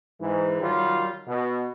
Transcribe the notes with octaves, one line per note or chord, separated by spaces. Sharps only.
G#2 E3
D#3 F#3 G3 F4
B2